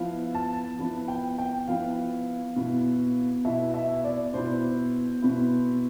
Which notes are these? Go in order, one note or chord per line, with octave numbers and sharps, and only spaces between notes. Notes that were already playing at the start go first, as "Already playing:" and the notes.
Already playing: F3 B3 E4 F5
A5
F3 B3 E4
G5
G5
F3 B3 E4 F5
B2 B3 E4
B2 B3 E4 E5
E5
D5
B2 B3 E4 C5
B2 B3 E4